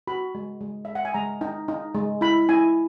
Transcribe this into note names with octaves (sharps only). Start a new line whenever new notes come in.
F#4 B5
G#3
G#3
G#3 E5
F#5
G#5
G#3 A#5
D#4
D#4
G#3
E4 B5
E4 G#5